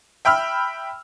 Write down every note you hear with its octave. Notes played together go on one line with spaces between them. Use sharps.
E5 G5 B5 E6 F6